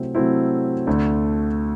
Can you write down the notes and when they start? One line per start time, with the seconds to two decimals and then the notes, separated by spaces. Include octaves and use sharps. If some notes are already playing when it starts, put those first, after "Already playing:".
Already playing: C3 F#3 A3 C4 E4
0.15 C3 F#3 A3 C4 E4
0.87 D2 D3 A3